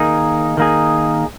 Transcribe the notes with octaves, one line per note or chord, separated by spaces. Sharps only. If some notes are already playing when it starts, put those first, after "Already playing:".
Already playing: D#3 A#3 D#4 G#4
D#3 A#3 D#4 G#4